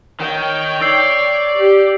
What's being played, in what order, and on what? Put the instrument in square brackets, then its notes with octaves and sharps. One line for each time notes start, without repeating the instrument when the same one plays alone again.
[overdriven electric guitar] D#3 [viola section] C#5 G5
[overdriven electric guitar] D5 [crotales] E6 C7
[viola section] G4